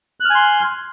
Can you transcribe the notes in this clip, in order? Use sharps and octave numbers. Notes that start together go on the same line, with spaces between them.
G#5 C6 F6 F#6